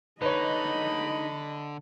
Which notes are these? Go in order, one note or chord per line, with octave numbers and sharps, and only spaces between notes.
D3 D#4 B4 C#5 D#5 B5